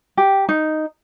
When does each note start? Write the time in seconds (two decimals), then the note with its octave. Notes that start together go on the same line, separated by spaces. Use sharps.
0.17 G4
0.49 D#4